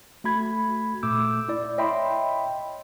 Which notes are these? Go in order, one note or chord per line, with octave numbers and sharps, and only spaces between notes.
A3 F#4 B5 G#6
A#2 A3 D6 E6 G6
E4 D5
C#5 D#5 E5 G5 B5 C6